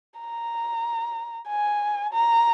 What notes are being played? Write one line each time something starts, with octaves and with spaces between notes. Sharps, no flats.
A#5
G#5
A#5